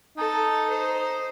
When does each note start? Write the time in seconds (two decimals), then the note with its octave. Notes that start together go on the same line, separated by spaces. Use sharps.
0.18 D#4 A4
0.70 C5